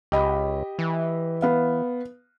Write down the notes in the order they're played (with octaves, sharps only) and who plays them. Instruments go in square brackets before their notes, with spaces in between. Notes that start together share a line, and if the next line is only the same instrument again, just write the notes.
[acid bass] C#2 [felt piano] G4 D#5 B5
[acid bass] E3
[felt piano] B3 F5